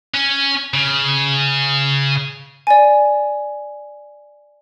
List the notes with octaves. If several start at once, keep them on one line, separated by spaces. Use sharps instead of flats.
C#4
C#3
D5 G#5